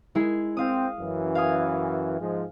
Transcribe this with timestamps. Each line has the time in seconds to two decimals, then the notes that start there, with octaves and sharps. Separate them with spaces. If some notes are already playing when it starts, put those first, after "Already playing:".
0.15 G#3 E4 G#4
0.57 C4 F5 D#6
0.98 F#2 E3
1.35 F5 G#5 D#6
2.20 G#2 F3 G#3